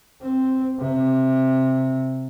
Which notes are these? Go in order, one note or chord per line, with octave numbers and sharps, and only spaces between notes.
C4
C3